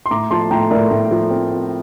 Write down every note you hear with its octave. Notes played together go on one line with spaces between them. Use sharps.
C6
A2 A#5 D6
F3 A5 C6
A2 G5 A#5
A2 A#4 D5
A2
F3
C4
C4